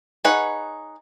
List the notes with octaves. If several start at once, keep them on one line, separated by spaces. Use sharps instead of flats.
D#4 G#4 B4 C#5 F#5